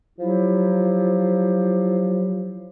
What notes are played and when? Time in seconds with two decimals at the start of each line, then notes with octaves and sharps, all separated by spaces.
0.19 F3 F#3 E4 G4